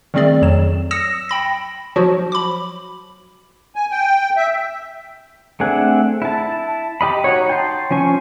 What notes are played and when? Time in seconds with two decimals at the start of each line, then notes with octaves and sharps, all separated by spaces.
0.14 D#3 G3 A3 C4 G#4 D5
0.42 F2 F#3 E7
0.91 D#6 E6 A#6 C#7 E7
1.29 G5 B5 A#6
1.96 F3 F#3 F#4
2.32 B5 D6
3.76 G#5
3.91 G5
4.37 E5
5.60 A3 C4 D4 G#4 F#5
6.22 E4 A5
7.01 G4 D#5 B5
7.24 D#4 F#4 C#5
7.49 G5 A5 C6
7.91 F3 C#4 G#5 C#6